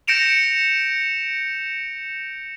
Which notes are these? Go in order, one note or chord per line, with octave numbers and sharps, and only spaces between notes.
G6 A#6 C#7 D7 E7 F7